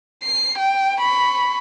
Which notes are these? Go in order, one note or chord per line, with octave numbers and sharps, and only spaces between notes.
C7
G5
B5 C#6